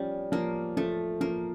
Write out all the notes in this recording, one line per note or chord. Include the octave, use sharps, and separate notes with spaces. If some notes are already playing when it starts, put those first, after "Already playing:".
Already playing: F3 G3 C#4
F3 A#3
F3 A3
F3 A#3